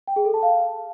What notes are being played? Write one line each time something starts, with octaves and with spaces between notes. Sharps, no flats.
G5
G#4
A4
A5
F5